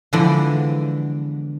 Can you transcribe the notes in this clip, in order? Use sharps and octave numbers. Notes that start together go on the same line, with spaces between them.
D3 E3 F3 G#3 B3 D4